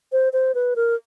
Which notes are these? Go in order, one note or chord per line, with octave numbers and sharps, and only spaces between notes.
C5
C5
B4
A#4